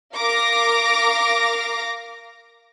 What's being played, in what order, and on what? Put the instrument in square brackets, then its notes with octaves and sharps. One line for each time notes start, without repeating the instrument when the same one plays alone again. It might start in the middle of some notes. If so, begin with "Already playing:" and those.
[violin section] A#4 F5 D6 A#6